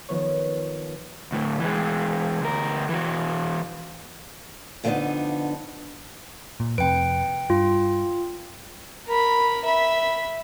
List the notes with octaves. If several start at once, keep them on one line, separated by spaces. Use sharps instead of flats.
D#3 F3 B3 C#5
D2 A2
E3 G#3
D2 A#4
E3 F#4
F2 D3 A3 B3 D4 D#4
A#2
F2 C3 B4 G5 D7
G2 F4
A#4 B5
E5 B5